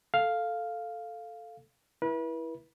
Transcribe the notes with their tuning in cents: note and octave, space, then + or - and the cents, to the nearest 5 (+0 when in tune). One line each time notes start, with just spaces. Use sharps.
A4 +0 F5 +0
E4 +0 B4 -35